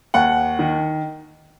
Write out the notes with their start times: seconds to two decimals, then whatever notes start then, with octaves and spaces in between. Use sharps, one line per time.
0.14 D#2 F#5
0.59 D#3